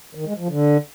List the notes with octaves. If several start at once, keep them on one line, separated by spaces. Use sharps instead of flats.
D#3
G#3
F3
D3